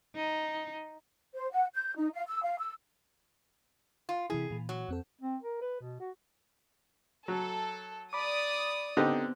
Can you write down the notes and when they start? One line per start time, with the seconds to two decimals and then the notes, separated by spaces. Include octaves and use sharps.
0.15 D#4
1.34 C5
1.52 F#5
1.74 G6
1.96 D#4
2.13 F5
2.27 E6
2.43 F5
2.58 E6
4.09 F4
4.30 C3 E3 E4 G#4
4.51 A#2 E3
4.69 F#3
4.88 F2 C4 A4
5.21 C4
5.42 A#4
5.61 B4
5.80 B2
6.00 F#4
7.28 F#3 A4
8.13 D5 B5 D6 D#6
8.97 D3 B3 C4 D#4 G4 C5